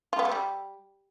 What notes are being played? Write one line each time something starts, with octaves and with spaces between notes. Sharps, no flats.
F4
B3
A3
G3